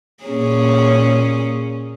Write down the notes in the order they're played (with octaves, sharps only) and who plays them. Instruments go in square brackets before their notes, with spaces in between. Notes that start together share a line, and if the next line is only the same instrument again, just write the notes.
[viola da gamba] A#2 C#4 G#4